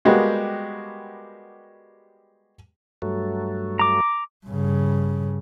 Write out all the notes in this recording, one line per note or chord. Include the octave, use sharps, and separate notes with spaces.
G3 G#3 A#3 B3 F#4 G4
G2 F#3 A3
A#5 D6
G2 C#3